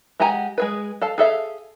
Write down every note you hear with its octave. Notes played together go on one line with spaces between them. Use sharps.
G#3 G4 F#5 G#5 A#5
G#3 G#4 B4
A4 F5 A5
G#4 A4 E5 F5